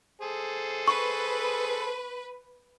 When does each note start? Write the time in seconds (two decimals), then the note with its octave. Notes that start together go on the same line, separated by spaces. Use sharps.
0.21 G#4 A4 C5
0.88 B4 C#6